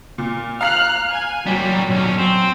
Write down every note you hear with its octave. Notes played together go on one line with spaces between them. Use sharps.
A#2
F5 A#5 F6 F#6 C7
G#5
A#2 F#3 G3
B1 C#4
C4